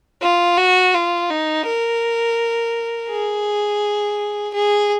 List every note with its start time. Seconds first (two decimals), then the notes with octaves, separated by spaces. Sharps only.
0.22 F4
0.58 F#4
0.94 F4
1.30 D#4
1.66 A#4
3.10 G#4
4.54 G#4